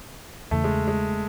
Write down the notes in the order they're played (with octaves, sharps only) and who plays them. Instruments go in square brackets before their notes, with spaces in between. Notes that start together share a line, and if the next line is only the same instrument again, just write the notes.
[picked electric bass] E2 C#3 E3 [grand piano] A3
[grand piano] G#3
G#3